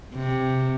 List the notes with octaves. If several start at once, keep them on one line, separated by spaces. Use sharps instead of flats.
C3